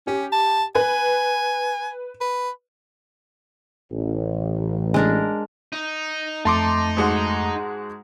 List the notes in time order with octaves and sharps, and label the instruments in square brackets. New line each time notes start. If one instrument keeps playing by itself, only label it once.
[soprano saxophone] C#4 [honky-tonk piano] G4
[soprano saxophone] A5
[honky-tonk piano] B4 [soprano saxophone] G#5
[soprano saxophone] B4
[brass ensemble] A1
[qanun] G#3 D4 A#4
[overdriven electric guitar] D#4
[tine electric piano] F2 A3 [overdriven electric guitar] D#4 [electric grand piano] A5 C6 D6
[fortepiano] G#2 G#3 F#4